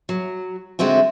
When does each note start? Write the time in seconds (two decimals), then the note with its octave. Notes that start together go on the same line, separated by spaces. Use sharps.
0.09 F#3
0.79 D3 G#3 A3 C4 F#4